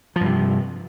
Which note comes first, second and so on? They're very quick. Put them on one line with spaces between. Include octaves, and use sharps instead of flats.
F3 G2 C3